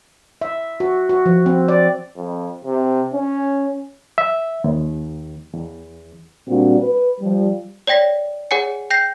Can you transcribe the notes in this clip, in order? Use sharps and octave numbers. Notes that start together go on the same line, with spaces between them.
E5
F#4
F#4
F3
C4
D5
F2
C3
C#4
E5
D#2
E2
A#2 G3 C4 D4 F#4
B4
F3 G3
C#5 D5 G5 A#6 B6
G#4 C#5 F#5 G#5 C#7
G5 G6 A#6 C7